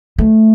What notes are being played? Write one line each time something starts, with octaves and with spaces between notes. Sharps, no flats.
A3